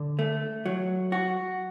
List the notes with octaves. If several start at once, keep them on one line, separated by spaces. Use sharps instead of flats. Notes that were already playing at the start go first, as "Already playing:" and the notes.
Already playing: D3
A3
F#3
F#4